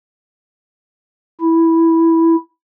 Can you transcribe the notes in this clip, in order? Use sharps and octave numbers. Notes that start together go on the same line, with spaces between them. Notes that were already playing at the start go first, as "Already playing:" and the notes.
E4